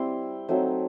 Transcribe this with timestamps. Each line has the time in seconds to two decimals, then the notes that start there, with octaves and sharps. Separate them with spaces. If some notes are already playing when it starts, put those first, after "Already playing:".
Already playing: G3 C4 E4 C6
0.48 F#3 A3 C4 D#4